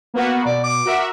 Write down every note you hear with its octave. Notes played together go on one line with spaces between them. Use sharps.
A#3 B3 F#4
B2 D5
D6
F#4 A#4 E5